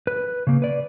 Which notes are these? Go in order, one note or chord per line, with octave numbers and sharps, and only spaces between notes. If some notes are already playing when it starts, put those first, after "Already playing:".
B4
C#3 A#3
B4 D5